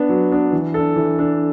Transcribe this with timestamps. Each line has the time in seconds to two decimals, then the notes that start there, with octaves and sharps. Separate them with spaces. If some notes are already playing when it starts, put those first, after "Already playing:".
Already playing: B3 D4
0.09 F#3
0.31 B3 D4
0.53 E3
0.74 D4 A4
0.96 E3
1.19 D4 A4